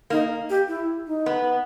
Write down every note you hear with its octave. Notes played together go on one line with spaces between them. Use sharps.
A#3 D#4
G4
E4
D#4
B3